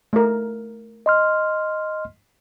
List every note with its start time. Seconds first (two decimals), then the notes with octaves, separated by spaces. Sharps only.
0.13 A3 A#4
1.06 D#5 C6 F6